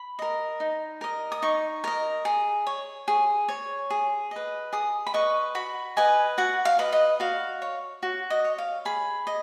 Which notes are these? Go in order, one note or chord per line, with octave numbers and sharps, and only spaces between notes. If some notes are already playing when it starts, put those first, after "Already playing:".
Already playing: B5
A#4 D#5
D#4
A#4 D#5
D#6
D#4 C#6
A#4 D#5
G#4
C#5
G#4
C#5
G#4
B4 D#5
G#4 D#6
B5
B4 D#5 C#6
F#4 B5
B4 D#5 G#5
F#4 F#5
F5
B4 D#5
D#5
F#4 F5
C#5
F#4
D#5
C#5
F5
G#4 B5
D#5